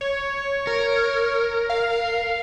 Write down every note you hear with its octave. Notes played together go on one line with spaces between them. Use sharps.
C#5
A#4
F5